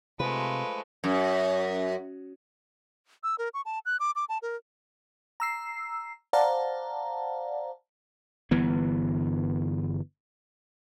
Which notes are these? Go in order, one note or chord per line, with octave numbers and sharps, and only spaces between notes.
C3 F3 G#3 A3 B4
F#2
E6
A#4
C#6
A5
F#6
D6
D6
A5
A#4
A#5 E6 C7
C5 D5 F5 F#5 A5 A#5
G1 E3 B3